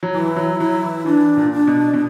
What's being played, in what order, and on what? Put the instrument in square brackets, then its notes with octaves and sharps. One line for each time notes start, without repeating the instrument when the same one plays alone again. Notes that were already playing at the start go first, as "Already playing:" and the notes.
[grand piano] F#3
[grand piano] E3 [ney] E4
[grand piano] E3
F#3
[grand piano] F#3 [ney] E4
[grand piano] E3
[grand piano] E3 [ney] D4
[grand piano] A#2
[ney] D4
[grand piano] B2
B2